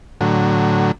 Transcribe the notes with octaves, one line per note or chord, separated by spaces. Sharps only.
A2 D3 F#3